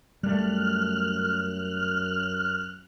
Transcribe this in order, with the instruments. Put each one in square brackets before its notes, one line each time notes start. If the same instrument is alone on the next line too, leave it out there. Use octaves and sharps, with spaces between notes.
[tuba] F#2 [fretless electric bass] G3 A3 [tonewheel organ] F6 F#6